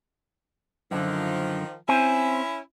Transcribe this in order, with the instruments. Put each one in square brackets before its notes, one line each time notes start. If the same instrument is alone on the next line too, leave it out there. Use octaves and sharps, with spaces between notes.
[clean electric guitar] F#2 D3 [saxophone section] D#3 F3
[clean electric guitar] C4 C5 G#5 [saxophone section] C#4 E4